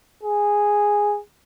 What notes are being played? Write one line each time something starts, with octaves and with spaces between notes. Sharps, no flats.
G#4